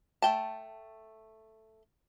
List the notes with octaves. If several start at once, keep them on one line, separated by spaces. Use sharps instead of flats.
A3 G5 A5